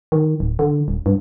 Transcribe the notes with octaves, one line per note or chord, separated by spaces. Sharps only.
D#3
D1
D3
D#1
G2